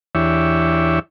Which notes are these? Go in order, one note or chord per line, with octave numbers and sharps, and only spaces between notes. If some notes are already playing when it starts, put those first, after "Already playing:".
E2 E3 D4 G4 C#5 E5